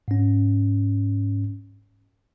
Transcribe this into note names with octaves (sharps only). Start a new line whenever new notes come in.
G#2 C#4